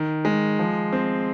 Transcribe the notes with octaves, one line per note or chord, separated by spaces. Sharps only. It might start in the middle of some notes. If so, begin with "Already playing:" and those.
Already playing: D#3
G#3
F3
C4